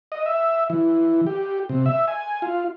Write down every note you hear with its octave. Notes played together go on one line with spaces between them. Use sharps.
D#5
E5
E3
G4
C3
E5
G#5
F4